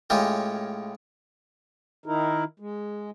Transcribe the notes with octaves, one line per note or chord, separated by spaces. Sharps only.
A2 G#3 C#4 F4 G4
D#3 D#4 E4 A#4
G#3